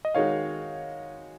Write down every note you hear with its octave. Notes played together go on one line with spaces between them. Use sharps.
D#5
D#3 G#3 D#4 F#4 C#5 F5